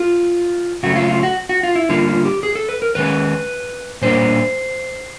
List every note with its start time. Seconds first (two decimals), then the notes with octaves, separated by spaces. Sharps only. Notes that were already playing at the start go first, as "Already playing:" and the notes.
Already playing: F4
0.83 C#3 F#3 A3 F#4
0.96 F4
1.09 F4
1.23 F#4
1.49 F#4
1.63 F4
1.75 E4
1.89 D3 G3 A#3 F4
2.07 F4
2.25 G4
2.43 G#4
2.55 A4
2.69 B4
2.82 A#4
2.95 D#3 G#3 C#4 B4
4.02 A#2 G3 A#3 D4 C5